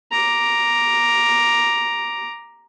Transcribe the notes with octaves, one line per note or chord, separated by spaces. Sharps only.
A#5 D6